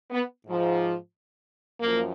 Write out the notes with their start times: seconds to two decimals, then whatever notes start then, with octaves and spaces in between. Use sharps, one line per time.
0.11 B3
0.45 G#2 F3
1.80 F#2 F3 A#3